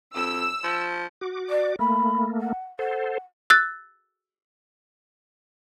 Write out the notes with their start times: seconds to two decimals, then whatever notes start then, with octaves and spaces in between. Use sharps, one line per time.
0.16 F2 E6
0.64 F3
1.21 F#4 D6
1.49 D5
1.79 A3 A#3 B5
2.40 F#5
2.79 A4 C5 F#5
3.50 E6 F#6 A6